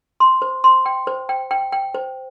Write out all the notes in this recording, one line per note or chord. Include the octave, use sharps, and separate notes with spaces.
C6
C5
C6
G5
C5
G5
G5
G5
C5